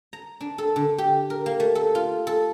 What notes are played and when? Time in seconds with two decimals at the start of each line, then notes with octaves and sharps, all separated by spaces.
0.13 A#5
0.41 D4
0.58 A4
0.76 D3
0.98 G4
1.30 A#4
1.46 A#3
1.60 A3
1.75 A4
1.95 F4
2.27 A4